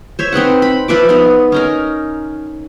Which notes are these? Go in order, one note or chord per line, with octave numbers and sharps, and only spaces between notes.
C5 C#5 E5
C4 D#4 B4 F#5
B5
F3 B4 E5 D6
B3 D#4
C#4 D#4 A#4